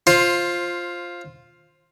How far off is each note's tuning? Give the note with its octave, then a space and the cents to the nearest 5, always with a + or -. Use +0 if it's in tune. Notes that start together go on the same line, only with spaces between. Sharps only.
F4 +0 C5 +15